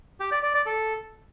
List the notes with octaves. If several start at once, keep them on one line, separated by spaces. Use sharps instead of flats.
G4
D5
D5
D5
A4